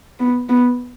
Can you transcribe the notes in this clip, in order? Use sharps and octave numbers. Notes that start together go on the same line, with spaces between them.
B3
B3